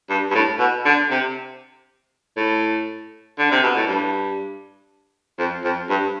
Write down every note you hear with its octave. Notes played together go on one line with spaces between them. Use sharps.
G2
G2
A2
B2
D3
C3
A2
D3
C3
B2
A2
G2
F2
F2
G2